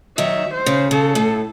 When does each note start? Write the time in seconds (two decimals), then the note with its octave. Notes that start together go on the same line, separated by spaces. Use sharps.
0.18 D#3 F#3 E5
0.54 C5
0.66 C#3
0.91 C#3 A4
1.15 A2